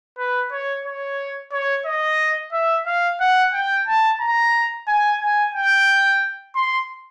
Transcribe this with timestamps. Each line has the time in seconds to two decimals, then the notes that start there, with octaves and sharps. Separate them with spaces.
0.18 B4
0.51 C#5
0.85 C#5
1.52 C#5
1.85 D#5
2.52 E5
2.86 F5
3.20 F#5
3.53 G5
3.87 A5
4.20 A#5
4.87 G#5
5.20 G#5
5.54 G5
6.55 C6